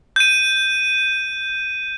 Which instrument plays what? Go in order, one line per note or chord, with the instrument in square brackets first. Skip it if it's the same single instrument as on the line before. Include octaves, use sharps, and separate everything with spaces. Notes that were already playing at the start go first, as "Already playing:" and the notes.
[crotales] G6 D#7